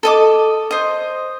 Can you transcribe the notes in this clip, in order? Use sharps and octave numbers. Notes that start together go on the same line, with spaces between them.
A4 D#5 D6
C5 D#5